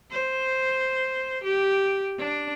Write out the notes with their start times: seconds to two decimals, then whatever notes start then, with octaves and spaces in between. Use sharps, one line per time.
0.11 C5
1.44 G4
2.18 D4